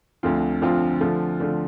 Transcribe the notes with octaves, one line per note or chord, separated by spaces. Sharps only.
D2 D3 F3 C4 F4
D2 D3 F3 C4 F4
D3 F3 A3 F4
D3 F3 A3 F4